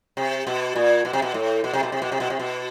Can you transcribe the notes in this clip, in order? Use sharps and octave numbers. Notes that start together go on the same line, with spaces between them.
C3
B2
A#2
B2
C3
B2
A2
B2
C3
B2
C3
B2
C3
B2
C3
B2